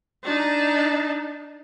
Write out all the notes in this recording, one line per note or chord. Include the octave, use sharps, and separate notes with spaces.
D4 D#4